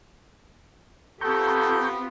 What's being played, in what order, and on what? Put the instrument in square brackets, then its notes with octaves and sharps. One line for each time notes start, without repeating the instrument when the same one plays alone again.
[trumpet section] B3 [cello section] C4 F4 G4 [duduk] A4 [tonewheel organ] A#5 C#6 G6